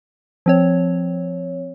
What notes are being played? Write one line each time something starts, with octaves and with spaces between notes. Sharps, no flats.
F3 C4 C#5